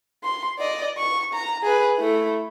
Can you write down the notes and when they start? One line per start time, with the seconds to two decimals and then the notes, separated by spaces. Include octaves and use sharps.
0.24 C6
0.58 D5 D#5
0.98 C#6
1.34 A#5
1.63 G#4 B4
1.98 A3 E4